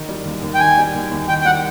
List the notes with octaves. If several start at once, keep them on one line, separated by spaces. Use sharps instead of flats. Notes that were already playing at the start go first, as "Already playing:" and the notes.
Already playing: D#3
G3
D#2
D#2
G5
D#3 G#5
G3
D#2
D#2
D#3 G5
G5
G3 F#5